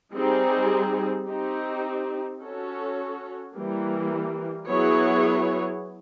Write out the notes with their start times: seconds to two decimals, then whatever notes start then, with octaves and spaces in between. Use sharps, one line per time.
0.14 G3 C4 D#4 G#4
1.27 C4 D#4 G4
2.40 C#4 F#4 A4 C#5
3.54 E3 G3 A#3
4.68 F#3 B3 E4 G#4 C#5